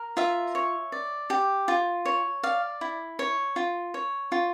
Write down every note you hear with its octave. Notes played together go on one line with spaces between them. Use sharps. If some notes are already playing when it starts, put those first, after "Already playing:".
Already playing: A#4
F4 E5
C#5
D5
G4
F4
C#5
D5 F5
E4
C#5
F4
C#5
F4